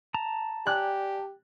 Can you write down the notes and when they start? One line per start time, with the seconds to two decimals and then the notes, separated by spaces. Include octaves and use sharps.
0.14 A5 A#5
0.67 G4 D5 G5 G#5 F#6